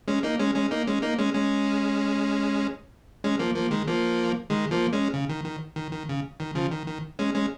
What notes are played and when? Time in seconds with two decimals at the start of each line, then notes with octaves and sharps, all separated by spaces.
0.08 G#3 C#4
0.23 A#3 D#4
0.39 G#3 C#4
0.55 G#3 C#4
0.71 A#3 D#4
0.87 G#3 C#4
1.02 A#3 D#4
1.19 G#3 C#4
1.34 G#3 C#4
3.24 G#3 C#4
3.39 F3 A#3
3.56 F3 A#3
3.71 D#3 G#3
3.87 F3 A#3
4.50 D#3 G#3
4.71 F3 A#3
4.93 G#3 C#4
5.14 C#3
5.29 D#3
5.45 D#3
5.76 D#3
5.92 D#3
6.09 C#3
6.40 D#3
6.55 C#3 F3
6.71 D#3
6.87 D#3
7.19 G#3 C#4
7.35 G#3 C#4